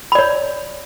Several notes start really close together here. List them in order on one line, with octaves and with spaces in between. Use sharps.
B5 D5 C#5